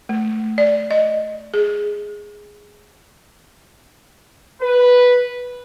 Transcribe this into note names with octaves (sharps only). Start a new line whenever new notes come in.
A3
D5
D#5
G#4
B4